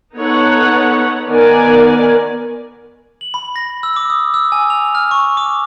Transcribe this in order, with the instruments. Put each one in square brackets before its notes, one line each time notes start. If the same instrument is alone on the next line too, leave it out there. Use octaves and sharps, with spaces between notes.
[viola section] B3 D#4 A4 B4 C#5 F#5
D#3 B3 A#4 D5 G#5
[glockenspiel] F#7
B5
A#6
E6
D6
D#6
E6
G#5
F7
F6
C#6
D6